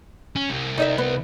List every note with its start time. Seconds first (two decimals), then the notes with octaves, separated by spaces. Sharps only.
0.36 C#4
0.50 C2
0.78 D#4 D#5 E5
0.98 B3